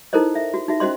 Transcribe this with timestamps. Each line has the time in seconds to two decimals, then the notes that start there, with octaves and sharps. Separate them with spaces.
0.13 D#4 E4 A4 A#4 C5 D#5
0.35 E5
0.54 F#4
0.68 D#4 F#4 E5
0.80 C#4 F#4 C5 D#5 C6